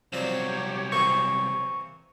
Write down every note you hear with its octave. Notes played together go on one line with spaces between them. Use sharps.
C2 F3 F#3 C4 G4 C#5 D5
E3 A#3 C4 C#6